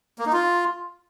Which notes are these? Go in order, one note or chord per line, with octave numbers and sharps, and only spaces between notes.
A#3
D#4
F4